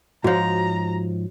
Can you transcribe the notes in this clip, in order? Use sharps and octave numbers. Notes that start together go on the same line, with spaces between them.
G#2 F3 F#4 C#5 A#5